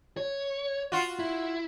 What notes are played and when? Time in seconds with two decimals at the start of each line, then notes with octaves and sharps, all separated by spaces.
0.17 C#5
0.92 F4 F#4
1.19 E4